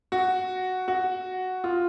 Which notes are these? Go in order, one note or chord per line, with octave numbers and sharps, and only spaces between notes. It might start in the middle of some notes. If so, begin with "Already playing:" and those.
F#4
F#4
F4